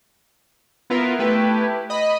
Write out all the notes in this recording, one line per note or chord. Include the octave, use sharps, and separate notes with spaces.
B3 E4 F4 A#4 B4
A3 E4 G4 B4
D#5 B5